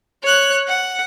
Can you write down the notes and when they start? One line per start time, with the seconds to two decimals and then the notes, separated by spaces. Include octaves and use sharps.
0.23 C#5 F#6
0.68 F#5